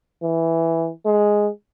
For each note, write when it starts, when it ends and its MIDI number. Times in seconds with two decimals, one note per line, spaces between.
0.23 0.91 52
1.06 1.49 56